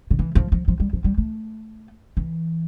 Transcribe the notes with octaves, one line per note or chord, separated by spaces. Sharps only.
D3
E3
F3
F3
F3
G3
F3
G3
A3
E3